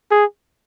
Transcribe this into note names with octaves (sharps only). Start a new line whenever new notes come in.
G#4